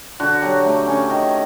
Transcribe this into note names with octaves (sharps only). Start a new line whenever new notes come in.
D3 F#4
F#3 G4
A3
C#4
D#3